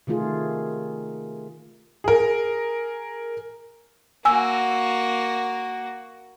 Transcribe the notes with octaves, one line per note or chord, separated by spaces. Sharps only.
C3 D#3 A3 F4 G#4
G#4 A#4
A#3 F#4 G#5 E6